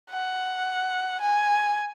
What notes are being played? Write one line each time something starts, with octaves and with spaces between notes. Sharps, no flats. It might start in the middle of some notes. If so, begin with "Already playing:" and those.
F#5
G#5